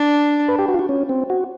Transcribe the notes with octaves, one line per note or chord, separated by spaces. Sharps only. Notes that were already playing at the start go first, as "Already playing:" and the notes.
Already playing: D4
B4
G4
F#4
F4
F#4
C#4
C4
F#4